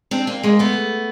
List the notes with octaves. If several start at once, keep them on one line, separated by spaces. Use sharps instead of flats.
C4 D4
A#3 C4
G#3 A#3
A3 B3